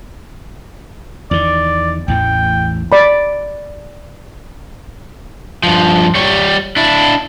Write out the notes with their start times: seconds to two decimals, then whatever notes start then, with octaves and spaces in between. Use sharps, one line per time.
1.31 E2 D#3 D5
2.08 A1 E2 A2 G5
2.92 D5 B5
5.63 G2 F3
6.15 G3 C#5
6.77 D4 E4